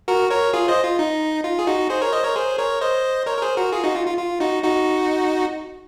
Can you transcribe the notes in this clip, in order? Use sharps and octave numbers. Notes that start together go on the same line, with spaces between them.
F#4 A#4
A#4 C#5
F4 G#4
C5 D#5
F4
D#4
F4
G#4
D#4 F#4
G#4 C5
A#4 C#5
C5 D#5
A#4 C#5
G#4 C5
A#4 C#5
C5 D#5
A#4 C#5
A#4
G#4 C5
F#4 A#4
F4 G#4
D#4 F#4
F4
F4
F4
D#4 F#4
D#4 F#4